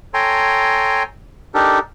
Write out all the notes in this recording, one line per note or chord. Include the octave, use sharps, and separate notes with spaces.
A4 C#5 G5 G#5 A#5 C6
D4 D#4 G4 A4 A#4